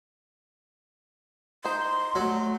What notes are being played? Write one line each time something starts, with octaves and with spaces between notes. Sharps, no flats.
D#4 C5 C6
F#3 A3